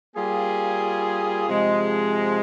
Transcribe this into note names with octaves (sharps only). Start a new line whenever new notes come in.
G3 A#3 F4 G#4
C3 F3 G#3